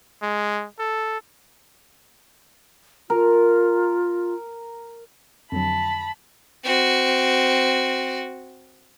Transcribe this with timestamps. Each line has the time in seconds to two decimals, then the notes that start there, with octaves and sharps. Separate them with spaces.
0.22 G#3
0.79 A4
3.10 F4 A#4
5.52 F2 D3 F#3 A5 B5
6.64 C4 F#4